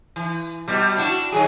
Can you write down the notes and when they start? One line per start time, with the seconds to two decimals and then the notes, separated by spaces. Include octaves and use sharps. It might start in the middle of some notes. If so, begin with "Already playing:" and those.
0.16 E3
0.68 B2 G3
0.97 D4 E4 F#4
1.32 D#3 F#3 G#4